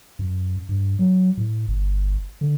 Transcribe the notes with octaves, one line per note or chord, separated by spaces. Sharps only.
F#2
G2
F#3
A2
G1
D3